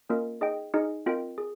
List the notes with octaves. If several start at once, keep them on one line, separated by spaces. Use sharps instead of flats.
A#3 C#4 F4 A#4 D#5
D#4 G#4 D#5 G5
D#4 G#4 D#5 G#5
C4 F4 A#4 D#5 G5
G#4